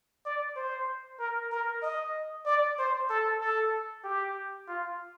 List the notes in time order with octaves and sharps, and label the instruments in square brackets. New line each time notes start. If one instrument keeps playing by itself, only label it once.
[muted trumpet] D5
C5
A#4
A#4
D#5
D5
C5
A4
A4
G4
F4